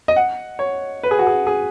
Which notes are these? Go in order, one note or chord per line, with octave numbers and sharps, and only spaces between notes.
D#5
F#5
C#5
B4
G#4
F#4
G#4
G#4